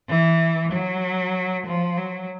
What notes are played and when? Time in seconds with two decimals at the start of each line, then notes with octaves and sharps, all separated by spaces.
0.09 E3
0.72 F#3
1.66 F3
1.97 F#3